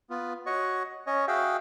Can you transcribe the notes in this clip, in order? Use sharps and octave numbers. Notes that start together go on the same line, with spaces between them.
B3 F4
F#4 C#5 D#5 C#6
C#4 C#5 D#5
F#4 G#4 E5 F5 G5